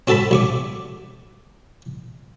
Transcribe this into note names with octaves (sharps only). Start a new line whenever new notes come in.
C4 F#4 A4 A5 B5
B1 C#6 D6